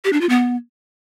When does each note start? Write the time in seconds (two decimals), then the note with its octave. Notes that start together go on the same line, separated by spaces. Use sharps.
0.05 G4
0.13 D4
0.21 F4
0.29 B3